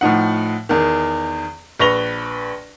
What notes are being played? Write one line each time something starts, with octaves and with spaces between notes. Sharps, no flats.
A2 F3 D#4 F#5
E2 D#3
A#1 B4 C#6 A#6 F7 G7